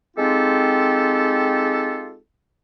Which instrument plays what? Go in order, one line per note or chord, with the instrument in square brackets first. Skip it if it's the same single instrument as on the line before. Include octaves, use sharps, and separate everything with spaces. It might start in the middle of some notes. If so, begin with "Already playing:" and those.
[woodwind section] G#3 C4 D#4 F4 G4 A4